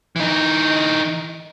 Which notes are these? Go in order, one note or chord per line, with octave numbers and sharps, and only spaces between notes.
E3 D#4